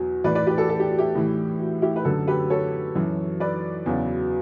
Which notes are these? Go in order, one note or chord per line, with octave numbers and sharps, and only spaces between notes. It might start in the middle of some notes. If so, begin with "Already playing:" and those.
Already playing: E2 B2 F#3
A2 E3 B4 D5
B4 D5
G4 B4
F#4 A4
A4
G4
F#4
E4 G4
A2 E3
F#4
E4 G4
B4
F#2 D3 F#3 F#4 A4
G4 B4
A4 C#5
F#2 E3
B4 D5
E2 C#3 F#3